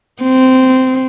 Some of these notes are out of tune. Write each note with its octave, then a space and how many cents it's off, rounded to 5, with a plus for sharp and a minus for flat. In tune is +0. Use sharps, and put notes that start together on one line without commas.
C4 -15